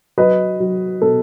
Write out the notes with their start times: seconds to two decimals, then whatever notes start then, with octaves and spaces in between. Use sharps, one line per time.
0.18 F#3 B4 D#5
0.60 F#3
1.02 B2 A4